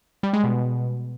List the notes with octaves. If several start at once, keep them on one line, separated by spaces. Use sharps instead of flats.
G3
G#3
B2